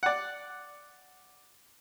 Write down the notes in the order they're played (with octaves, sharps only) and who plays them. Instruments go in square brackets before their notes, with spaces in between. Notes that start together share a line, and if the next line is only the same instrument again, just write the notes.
[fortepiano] D5 F#5